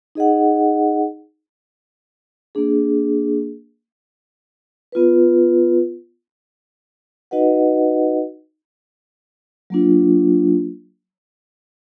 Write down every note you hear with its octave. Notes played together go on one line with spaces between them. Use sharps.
D#4 G#4 D#5 F#5
A#3 D4 G#4
B3 F4 B4
D#4 F#4 B4 D#5 F#5
F#3 A#3 D4 F4